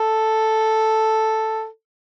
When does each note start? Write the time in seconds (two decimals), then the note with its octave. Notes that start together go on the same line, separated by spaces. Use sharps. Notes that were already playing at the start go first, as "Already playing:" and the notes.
Already playing: A4